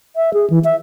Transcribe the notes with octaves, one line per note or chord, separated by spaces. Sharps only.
E5
G#4
E3
E5